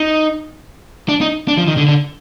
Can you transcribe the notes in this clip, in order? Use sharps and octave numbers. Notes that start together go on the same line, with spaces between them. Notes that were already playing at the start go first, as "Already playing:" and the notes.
Already playing: D#4
D4
D#4
D4
F3
D#3
D3
D3